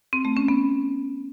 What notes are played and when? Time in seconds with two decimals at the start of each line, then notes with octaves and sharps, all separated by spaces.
0.13 C4
0.25 A3
0.37 C#4
0.48 B3